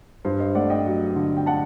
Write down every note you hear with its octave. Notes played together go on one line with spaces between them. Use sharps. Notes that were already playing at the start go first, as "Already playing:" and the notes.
G2 C5
C5 D#5
A3 D5 F#5
D#5 G5
F#3
D3
G5
F#5 A5